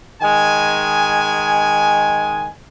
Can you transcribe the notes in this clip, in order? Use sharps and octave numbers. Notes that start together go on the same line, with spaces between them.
D#3 G#3 G#5